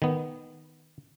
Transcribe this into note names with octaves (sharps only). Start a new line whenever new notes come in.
D#3 B3